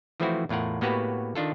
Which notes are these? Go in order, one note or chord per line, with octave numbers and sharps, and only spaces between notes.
E3 F3 A3 C4 E4 F#4
E2 A2 F4 A#4 F#5
A2 A#3 B3 F#4 G4 B4
D#3 D4 F4 A4